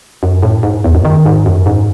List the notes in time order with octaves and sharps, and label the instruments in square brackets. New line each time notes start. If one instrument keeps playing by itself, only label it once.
[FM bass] F#2
A2
G#2
E2
F#2
D#3
G#2
F#2
G#2